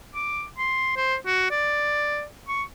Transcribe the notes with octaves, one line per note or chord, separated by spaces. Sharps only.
D6
C6
C5
F#4
D5
C#6